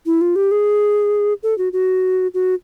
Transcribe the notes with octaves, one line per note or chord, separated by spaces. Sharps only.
E4
F4
G4
G#4
A4
F#4
F#4
F#4